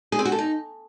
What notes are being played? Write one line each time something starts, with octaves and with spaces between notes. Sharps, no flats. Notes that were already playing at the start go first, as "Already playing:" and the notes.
G#4
C4
F#4
A4
D#4